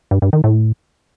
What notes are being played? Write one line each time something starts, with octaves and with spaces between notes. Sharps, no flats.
G2
G2
D#3
A2